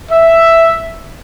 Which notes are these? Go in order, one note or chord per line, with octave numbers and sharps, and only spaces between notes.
E5